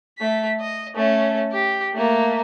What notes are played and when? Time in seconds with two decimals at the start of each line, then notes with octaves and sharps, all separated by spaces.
0.18 A3 B6
0.61 D#5
0.96 A3 C#4
1.52 G4
1.94 A3 A#3